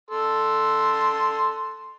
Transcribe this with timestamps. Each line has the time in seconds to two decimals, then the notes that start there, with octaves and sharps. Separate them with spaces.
0.10 A4 C6